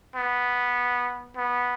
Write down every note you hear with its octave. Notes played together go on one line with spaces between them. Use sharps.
B3
B3